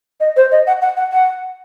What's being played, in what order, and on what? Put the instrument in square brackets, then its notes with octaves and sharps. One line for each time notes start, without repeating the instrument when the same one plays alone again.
[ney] D#5
C5
D#5
F#5
F#5
F#5
F#5